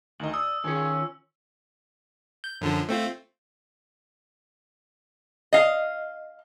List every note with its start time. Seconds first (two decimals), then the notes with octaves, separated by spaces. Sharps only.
0.20 D2 D#3 D#5 F#7
0.34 D5 D#6 E6
0.64 D#3 C#4 F4 G#4 C#5 G#5
2.44 G6
2.61 F#2 D3 F3
2.89 A3 C4 F4
5.53 D#5 F5